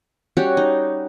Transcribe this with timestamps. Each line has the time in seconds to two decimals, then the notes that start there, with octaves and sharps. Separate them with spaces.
0.37 G3 C#4 F#4 G4
0.57 D#4